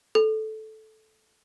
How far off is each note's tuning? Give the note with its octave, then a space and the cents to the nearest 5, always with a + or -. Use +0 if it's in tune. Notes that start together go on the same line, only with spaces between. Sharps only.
A4 -10